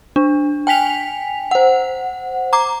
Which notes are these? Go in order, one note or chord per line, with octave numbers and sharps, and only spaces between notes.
D4
G5 G#5 B6 F7
C5 F#5
A#5 D6